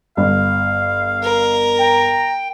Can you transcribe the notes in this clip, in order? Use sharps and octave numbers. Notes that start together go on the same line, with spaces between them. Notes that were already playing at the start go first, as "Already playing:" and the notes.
G1 F5
A#4
G5 A#5